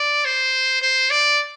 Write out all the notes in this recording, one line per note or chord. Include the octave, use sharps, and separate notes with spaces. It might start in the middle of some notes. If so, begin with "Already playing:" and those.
Already playing: D5
C5
C5
D5